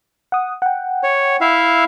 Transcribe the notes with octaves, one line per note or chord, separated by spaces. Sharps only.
F#5 D#6
F#5 G5
C#5
E4 E5 F5